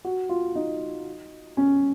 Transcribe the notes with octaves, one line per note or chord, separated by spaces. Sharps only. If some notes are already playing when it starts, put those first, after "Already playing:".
F#4
F4
D#4
C#4